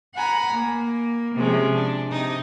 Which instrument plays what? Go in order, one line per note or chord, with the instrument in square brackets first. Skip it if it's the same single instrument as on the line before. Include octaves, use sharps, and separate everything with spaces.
[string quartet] F#5 G#5 A#5 B5
A#3
C3 F3 G#3 C#4
D4
C3 D#4